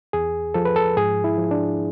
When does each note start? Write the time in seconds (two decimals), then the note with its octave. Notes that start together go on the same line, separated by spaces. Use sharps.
0.13 E2 G#4
0.54 F3 A4
0.65 B4
0.76 A4
0.97 G#2 G#4
1.24 E4
1.38 F3
1.51 D4